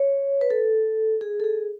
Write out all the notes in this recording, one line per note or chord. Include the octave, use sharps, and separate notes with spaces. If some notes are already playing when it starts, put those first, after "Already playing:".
Already playing: C#5
B4
A4
G#4
A4
G#4